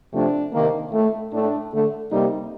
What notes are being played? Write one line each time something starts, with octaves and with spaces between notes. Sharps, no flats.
C3 F3 A3 D4
C3 D#3 A#3
A2 A3
A2 A3 D4
D3 A3
C3 G3 A#3 D#4